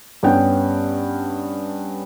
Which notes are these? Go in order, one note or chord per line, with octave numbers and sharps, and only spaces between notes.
G2 B3 C#4 F#5 G5